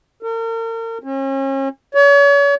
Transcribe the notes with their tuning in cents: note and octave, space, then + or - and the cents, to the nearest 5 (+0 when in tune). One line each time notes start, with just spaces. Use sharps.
A#4 -40
C#4 -40
C#5 +40